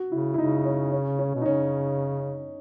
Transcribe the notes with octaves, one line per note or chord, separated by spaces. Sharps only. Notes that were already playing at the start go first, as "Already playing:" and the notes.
Already playing: F#4
C#3 E4
E4
C#3 D#4
C#4
C#4
C#4
B2
D#4
C#3 C#4